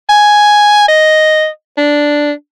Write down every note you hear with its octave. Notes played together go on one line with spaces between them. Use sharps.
G#5
D#5
D4